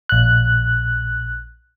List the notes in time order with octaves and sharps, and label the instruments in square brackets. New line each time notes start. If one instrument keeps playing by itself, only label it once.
[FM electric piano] A#1 F#6